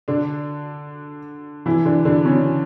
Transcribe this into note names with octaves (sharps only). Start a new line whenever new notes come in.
D3 D4
E3 E4
D3 D4
D3 D4
C#3 C#4